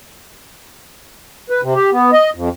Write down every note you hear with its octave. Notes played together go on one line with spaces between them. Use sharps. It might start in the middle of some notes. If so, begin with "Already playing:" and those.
B4
C3
G4
B3
D#5
F2